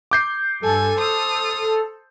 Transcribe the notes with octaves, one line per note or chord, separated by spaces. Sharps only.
D6 G6 C7
G2 A4 G#5
C5 D#6 F6